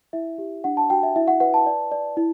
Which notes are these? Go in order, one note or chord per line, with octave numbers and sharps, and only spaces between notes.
E4 E5
G4
D4 F#5
A5
F#4 G5
E5
E4 E5
F#5
B4 F#5
A5
D5
D5
E4